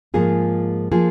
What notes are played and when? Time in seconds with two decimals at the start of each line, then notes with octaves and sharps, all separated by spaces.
0.14 G#2 F3 A#3 F4 G#4
0.91 F3 A#3 F4 G#4